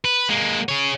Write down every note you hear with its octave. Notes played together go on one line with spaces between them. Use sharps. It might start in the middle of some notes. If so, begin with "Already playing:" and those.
B4
G#3 A#3
G#4 C#5